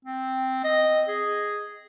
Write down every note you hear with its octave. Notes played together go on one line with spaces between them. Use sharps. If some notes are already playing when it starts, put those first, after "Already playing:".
C4
D#5
G#4